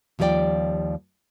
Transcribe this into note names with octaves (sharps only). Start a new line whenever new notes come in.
D#2 F3 G3 G#4 D5 G5